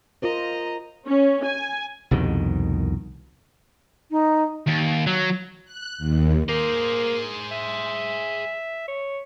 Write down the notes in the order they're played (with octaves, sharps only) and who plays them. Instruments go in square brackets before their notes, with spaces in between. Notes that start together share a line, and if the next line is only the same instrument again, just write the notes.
[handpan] F4 A#4 C5 [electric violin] D#5 A#5
[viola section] C#4
G#5
[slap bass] C2 F2 B2 D#3
[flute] D#4
[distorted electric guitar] D#2
F#3
[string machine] F#6
D#2
[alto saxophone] A#3 [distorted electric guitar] G#4 C5
[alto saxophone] E5
C#5